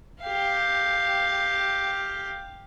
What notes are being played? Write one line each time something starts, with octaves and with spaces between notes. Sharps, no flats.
G4 F5